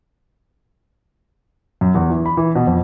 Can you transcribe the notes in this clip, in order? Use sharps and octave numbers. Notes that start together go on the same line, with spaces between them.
F#2
E2
E3
B5
E3
B2
F2